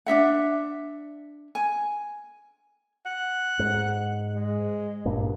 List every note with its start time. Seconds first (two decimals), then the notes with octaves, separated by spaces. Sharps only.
0.06 D4 D#4 E5 F#5
1.55 G#5
3.06 F#5
3.59 G#2
4.35 G#3
5.05 G#1 G2 A#2